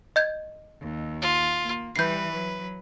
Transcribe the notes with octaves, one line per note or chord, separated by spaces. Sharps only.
D#5 G6 G#6
D#2
F4
A#3
E3 G3 B4 G6 C7
F#3